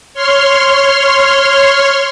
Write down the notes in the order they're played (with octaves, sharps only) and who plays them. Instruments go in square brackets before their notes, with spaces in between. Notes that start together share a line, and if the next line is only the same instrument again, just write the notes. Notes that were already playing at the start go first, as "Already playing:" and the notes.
[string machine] C#5 C6 F6